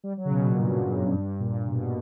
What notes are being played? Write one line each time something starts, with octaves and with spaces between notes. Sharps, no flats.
G3
F#3
C#3
B2
A#2
G2
A#2
G2
F#2
G2
A#2
B2